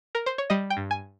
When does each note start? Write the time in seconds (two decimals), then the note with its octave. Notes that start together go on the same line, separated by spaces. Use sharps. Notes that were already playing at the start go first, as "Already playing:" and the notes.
0.15 A#4
0.26 C5
0.38 C#5
0.50 G3 D#5
0.70 G5
0.77 G2
0.91 G#5